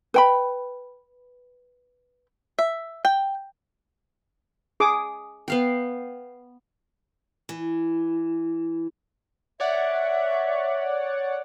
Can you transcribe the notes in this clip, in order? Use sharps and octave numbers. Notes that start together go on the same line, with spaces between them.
B4 G5 B5
E5
G5
G#4 D6 D#6
B3 F5 G5
E3
C#5 D5 E5 F#5